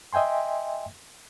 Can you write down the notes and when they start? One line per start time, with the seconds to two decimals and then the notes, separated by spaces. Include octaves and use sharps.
0.13 D#5 E5 G5 G#5 C6